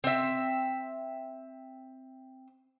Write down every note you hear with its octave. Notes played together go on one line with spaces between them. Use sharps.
C4 E5